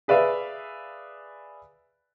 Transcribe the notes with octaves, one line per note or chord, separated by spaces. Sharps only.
G#4 B4 D5 E5 F5